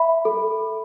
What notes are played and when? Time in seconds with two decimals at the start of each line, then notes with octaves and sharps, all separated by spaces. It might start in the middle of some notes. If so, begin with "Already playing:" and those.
Already playing: E5 B5
0.25 A4